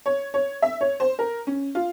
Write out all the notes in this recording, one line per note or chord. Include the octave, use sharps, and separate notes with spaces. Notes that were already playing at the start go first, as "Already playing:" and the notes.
C#5
C#5
E5
C#5
C5
A#4
C#4
F4